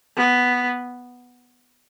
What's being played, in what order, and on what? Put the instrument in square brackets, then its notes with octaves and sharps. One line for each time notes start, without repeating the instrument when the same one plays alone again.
[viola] B3